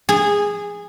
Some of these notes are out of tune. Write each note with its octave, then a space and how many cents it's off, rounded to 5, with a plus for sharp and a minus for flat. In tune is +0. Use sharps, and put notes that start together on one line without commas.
G#4 -15